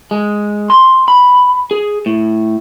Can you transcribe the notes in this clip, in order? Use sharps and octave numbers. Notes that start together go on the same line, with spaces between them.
G#3
C6
B5
G#4
A2